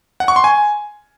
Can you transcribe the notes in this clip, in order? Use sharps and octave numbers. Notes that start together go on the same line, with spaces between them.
F#5
C#6
C6
G#5